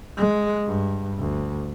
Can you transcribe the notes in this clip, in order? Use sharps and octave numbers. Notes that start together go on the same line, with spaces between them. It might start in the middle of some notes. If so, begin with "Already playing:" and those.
G#3
G2
D2